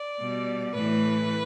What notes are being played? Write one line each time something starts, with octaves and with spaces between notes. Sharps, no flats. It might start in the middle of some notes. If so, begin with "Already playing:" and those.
Already playing: D5
B2 G3
A2 E3 A3 B4